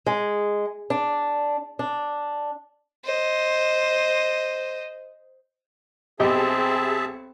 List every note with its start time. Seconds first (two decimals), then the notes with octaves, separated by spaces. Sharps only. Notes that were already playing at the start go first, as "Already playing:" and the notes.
0.06 G#3
0.90 D4
1.79 D4
3.05 C5 D#5
6.20 B1 C4 G4 G#4 D#5 E5 A5